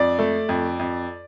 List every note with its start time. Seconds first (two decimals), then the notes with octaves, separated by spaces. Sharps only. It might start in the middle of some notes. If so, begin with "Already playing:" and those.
Already playing: F2 D5
0.19 A3
0.49 F2
0.79 F2